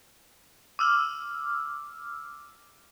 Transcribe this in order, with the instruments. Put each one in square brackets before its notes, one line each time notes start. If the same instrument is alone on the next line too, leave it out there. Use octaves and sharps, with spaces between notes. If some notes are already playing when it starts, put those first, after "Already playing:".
[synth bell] D6 E6 F6